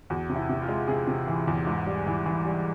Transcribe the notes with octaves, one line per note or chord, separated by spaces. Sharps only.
E2 F#4
C3
E4
C3
F4
G#3
C3 G#4
C3
E3
E2
G#2
G3
E3
E3
G3